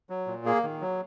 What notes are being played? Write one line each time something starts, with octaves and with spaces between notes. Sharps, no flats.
F#3
A#2
A#3 G#4
D#3
F#3